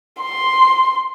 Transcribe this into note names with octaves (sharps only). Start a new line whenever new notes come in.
C6